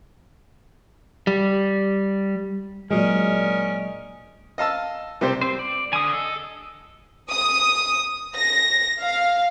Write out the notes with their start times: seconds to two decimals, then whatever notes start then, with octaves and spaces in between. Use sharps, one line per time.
1.27 G3
2.91 A#2 F#3 G#3 C#4 D4 A#4 D#5
4.58 D#5 F5 A5 E6
5.21 C3 G3 G4 C5
5.41 C4 C5
5.59 D5
5.93 D3 G#5 D#6
6.13 A4 D#5
7.31 D#6
8.35 A#6
9.01 F5